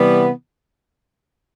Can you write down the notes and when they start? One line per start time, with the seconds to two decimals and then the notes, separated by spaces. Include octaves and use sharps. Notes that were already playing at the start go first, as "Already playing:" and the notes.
Already playing: C3 E3 G3 B3